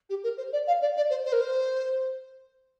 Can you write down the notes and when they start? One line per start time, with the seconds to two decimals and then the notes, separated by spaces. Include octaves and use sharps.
0.09 G4
0.23 A#4
0.37 C5
0.52 D5
0.67 F5
0.81 D5
0.96 D5
1.10 C5
1.25 C5
1.32 A#4
1.40 C5